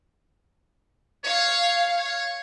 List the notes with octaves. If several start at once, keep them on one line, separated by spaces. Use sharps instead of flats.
C#5 F5
C#5